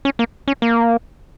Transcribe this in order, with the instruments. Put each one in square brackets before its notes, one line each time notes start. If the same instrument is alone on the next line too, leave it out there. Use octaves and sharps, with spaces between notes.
[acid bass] C#4
A#3
C#4
A#3